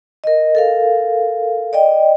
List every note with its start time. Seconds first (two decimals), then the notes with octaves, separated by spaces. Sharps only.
0.24 A#4 D#5
0.55 A4 A#4 F5
1.73 D5 D#5 G5